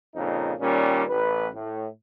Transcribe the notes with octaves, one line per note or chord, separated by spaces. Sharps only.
F2 A#2 C#3 D#4
A#2 D#3 G3 C#4
A1 B4
A2